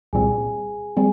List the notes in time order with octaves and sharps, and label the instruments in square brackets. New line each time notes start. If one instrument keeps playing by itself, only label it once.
[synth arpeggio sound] C2 A#2 G3 C4 [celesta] G#4 G#5
[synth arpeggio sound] G3 C4 [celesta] G#4 G#5